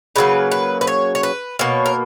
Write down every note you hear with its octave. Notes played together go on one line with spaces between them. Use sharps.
C#3 F#3 A#3 B4
B4
B4
C#5
C#5
B4
B2 A#3 C#5
A#4